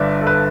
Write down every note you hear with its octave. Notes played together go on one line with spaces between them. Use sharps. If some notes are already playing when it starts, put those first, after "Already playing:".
Already playing: G1 G2 B4 D5 E5
A4
B4